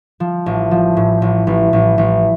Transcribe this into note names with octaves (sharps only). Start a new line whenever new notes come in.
F3
A1
F3
A2
A1
A1
A1
A1